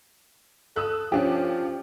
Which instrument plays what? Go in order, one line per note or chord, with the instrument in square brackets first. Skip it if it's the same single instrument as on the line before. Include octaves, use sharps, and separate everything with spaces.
[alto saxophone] A4 [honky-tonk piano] D#6 E6 F#6
[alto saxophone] F3 [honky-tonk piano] C#4 D4 G4